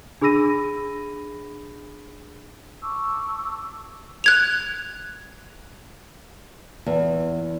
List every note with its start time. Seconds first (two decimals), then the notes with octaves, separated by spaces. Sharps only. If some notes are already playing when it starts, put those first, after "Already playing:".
0.21 D4 G#4 B5 E6 A#6 D#7
2.82 A5 C#6 D6 E6
4.24 F#6 G#6 F7
6.86 E2